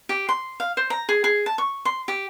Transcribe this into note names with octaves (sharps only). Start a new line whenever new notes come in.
G4
C6
F5
C5
A#5
G#4
G#4
A5
C#6
C6
G4